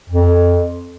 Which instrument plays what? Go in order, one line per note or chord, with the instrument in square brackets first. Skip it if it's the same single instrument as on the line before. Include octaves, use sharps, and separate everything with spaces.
[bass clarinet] F2